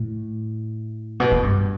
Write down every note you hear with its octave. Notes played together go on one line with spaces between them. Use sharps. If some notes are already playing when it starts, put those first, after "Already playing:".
Already playing: A2
B2
A2
G2